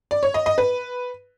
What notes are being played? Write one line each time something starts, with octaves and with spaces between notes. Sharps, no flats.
D5
C#5
D#5
D#5
B4